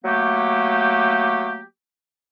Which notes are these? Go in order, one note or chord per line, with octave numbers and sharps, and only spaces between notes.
F#3 A3 A#3 G4